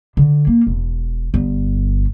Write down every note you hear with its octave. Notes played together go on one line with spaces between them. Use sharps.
D3
A#3
E1
G1